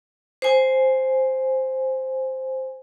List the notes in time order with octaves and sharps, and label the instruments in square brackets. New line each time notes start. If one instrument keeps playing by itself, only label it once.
[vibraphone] C5 G#5